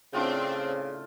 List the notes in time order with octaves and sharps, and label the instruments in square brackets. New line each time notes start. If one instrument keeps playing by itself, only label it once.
[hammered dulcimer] A2 F4 G5 [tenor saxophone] C#3 [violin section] C4 D4